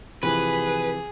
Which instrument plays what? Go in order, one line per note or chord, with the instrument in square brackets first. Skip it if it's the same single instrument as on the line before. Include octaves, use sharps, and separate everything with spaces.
[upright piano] C3 E3 F3 [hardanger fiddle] G#4 [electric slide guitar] B4